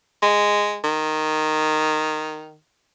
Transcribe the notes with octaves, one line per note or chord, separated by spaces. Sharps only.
G#3
D#3